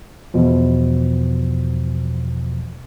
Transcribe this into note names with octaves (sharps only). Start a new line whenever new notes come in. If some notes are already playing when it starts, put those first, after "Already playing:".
E2 B2 F3